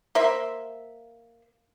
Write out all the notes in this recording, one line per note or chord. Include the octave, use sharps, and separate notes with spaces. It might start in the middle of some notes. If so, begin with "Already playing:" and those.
A#3 C5 E5